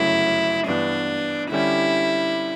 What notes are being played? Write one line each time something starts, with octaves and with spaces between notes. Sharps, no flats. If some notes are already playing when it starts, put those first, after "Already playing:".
Already playing: G1 F#2 C#3 F#3 A3 E4
G2 E3 B3 D4
D3 G3 C#4 E4 G4